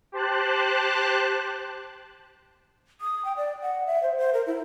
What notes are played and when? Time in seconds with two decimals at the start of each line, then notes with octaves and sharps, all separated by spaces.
0.12 G4 C5 A5 F#6
3.01 D#6
3.25 G5
3.37 D5
3.62 F#5
3.87 E5
4.03 C5
4.17 C5
4.34 A#4
4.47 E4